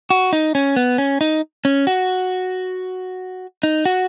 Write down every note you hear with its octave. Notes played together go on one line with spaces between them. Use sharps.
F#4
D#4
C#4
B3
C#4
D#4
C#4
F#4
D#4
F#4